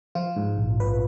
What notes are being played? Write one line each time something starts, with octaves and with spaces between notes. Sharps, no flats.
F3 F4
G#2
A#1
A#1 B4